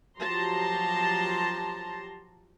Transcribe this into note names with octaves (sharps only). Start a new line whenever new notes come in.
F3 F#3 G4 A5 A#5 C6